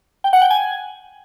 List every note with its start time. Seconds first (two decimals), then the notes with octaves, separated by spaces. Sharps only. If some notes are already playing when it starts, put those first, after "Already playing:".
0.24 G5
0.33 F#5
0.42 G5
0.50 G#5